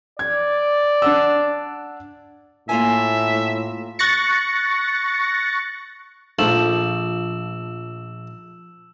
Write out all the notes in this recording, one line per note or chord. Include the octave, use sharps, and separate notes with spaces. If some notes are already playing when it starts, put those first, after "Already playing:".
D5 G#6
D4 F#5 E6
A2 A#3 F4 E5 G#5
C#6 F#6 A6 A#6 C#7
A#1 F3 A3 E6 E7 F#7